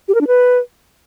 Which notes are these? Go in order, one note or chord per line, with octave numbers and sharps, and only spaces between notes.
G4
A#4
D4
B4